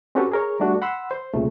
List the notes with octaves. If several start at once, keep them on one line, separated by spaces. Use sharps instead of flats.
C4 C#4 F#4 G4 A4 B4
G#4 A#4 C#5
G3 A3 D4 F#4
F#5 B5 C6 E6
C5
C2 A#2 C#3 A3